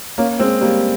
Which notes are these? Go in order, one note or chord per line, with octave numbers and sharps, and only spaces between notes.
A#3 C#4
G#3 C4
G3 A#3